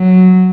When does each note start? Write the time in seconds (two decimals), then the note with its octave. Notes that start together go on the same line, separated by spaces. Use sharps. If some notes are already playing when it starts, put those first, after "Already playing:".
Already playing: F#3